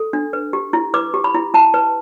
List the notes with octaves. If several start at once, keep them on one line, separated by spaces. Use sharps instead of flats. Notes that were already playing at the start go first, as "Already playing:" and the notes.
Already playing: A4
D4
B4
G4
E4
B4 D6
G4
B5
E4
E4 A5
B4